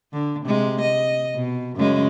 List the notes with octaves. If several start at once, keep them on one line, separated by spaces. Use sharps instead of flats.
D3
C3 G#3
D#5
B2
F#2 C#3 G#3